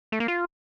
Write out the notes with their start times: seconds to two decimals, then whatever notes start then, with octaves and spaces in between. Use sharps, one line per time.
0.12 A3
0.20 A#3
0.28 F4